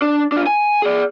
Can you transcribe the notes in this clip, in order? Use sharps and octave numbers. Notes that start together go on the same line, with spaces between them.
D4
D4 F4
G#5
G#4 D5